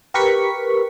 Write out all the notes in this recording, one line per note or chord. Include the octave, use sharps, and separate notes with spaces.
G4 A#4 B4 C#6 B6